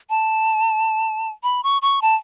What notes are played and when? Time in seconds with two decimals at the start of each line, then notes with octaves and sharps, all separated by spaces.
0.10 A5
1.43 B5
1.64 C#6
1.82 C#6
2.02 A5